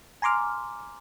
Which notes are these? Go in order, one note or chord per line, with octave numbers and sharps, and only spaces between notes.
G#5 A#5 C6 D6 F6